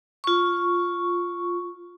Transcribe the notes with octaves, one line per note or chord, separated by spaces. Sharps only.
F4 C#6